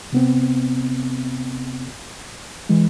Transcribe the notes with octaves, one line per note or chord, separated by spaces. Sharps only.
C3 B3 C4
E3 G#3